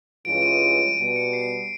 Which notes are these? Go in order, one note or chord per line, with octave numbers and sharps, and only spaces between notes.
G2 E3 G#3 C#4 F4 D7
D7
D#7
D7
D#7
B2 G3 B3 D7
C#7
C7